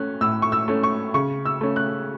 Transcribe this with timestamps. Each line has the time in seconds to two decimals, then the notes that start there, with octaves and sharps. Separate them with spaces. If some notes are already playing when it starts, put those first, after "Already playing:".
Already playing: A3 C#4 F#6
0.21 A2 E6
0.42 C#6
0.52 E6
0.68 A3 C#4
0.83 C#6
1.14 C#3 C#6
1.45 E6
1.61 A3 C#4
1.76 F#6